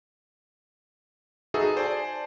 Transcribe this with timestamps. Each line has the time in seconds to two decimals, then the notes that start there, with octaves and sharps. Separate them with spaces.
1.54 D#4 F#4 G#4 A4 B4 E5
1.77 C5 D5 G#5 A5